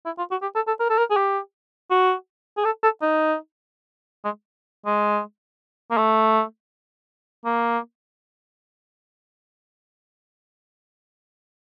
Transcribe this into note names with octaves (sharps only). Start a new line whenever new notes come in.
E4
F4
F#4
G4
A4
A4
A#4
A4
A#4
G#4
G4
F#4
G#4
A4
A4
D#4
G#3
G#3
A#3
A3
A#3